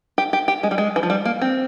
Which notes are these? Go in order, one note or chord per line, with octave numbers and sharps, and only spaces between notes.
G4
G4
G4
G#3
G3
G#3
E3
F3
G3
A#3
C4